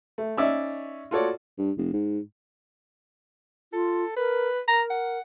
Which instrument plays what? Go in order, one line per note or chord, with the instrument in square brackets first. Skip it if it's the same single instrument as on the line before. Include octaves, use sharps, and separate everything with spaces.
[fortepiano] A3
C#4 D#4 D5 E5
F4 F#4 A4 C#5 D5
[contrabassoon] G2
F1
G#2
[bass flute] F4 [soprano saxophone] A4
[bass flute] A#4 [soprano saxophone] B4
[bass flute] A#4 [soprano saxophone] A#5
[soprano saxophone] F#5